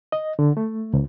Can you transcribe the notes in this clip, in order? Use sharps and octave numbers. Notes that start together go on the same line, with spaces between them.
D#5
D3
A3
C#2